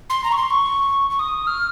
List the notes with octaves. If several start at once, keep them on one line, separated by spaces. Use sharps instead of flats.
C6
A#5
C#6
C6
C#6
C#6
D#6
F6